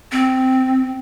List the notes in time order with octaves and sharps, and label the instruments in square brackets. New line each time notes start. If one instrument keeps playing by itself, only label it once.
[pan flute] C4